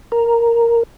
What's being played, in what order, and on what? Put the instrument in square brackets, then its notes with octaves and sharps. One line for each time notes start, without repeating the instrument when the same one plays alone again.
[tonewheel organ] A#4